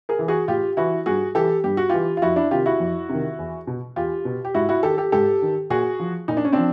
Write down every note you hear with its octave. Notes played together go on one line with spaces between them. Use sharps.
G#4 A#4
E3
F#4 G#4
A2 F4 G4
E3 E4 F#4
G2 F#4 G#4
E3 G4 A4
G2 G4
F#4
E3 F4 G4
F4
F2 E4 F#4
D4 E4
C3 D#3 F4 G4
E4 F#4
F2
C3 D#3
E2
B2
E2 F4 G4
B2
G4
G#2 E4 F#4
E4 F#4
D#3 G4 A4
G4 A4
G#2 G4 A4
D#3
A#2 F#4 G#4
F3
A#2 D#4
D4
C#4
F3 C4 D4